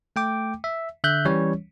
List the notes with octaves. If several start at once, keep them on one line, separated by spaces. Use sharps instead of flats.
A3 G5 D6
E5
D3 E5 F#6 G6
E3 G3 C#4 C#5